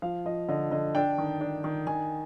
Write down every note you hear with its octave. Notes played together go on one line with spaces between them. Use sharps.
F3 F5
F3 D#5
D3 D#5
D3 D#5
D4 G5
D#3
D4
D#3
D#3 G#5